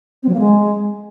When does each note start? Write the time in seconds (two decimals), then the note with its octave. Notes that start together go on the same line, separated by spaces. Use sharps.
0.23 C4
0.28 F#3
0.34 A#3
0.39 G#3